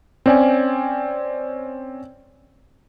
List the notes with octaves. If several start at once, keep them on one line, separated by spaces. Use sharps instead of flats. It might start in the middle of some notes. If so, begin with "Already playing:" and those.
C4 C#4 D5 G5 G#5